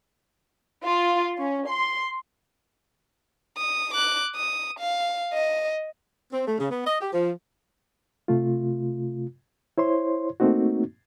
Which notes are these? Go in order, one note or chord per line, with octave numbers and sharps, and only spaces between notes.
F4
C#4
C6
D#6
D6 F#6
D#6
F5
D#5
C4
A3
C#3
B3
D#5
G4
F3
C3 A3 F4
E4 C5 C#5 C6
A3 A#3 C4 D#4 F#4